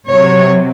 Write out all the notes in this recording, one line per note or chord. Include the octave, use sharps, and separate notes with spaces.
C3 F#3 C#5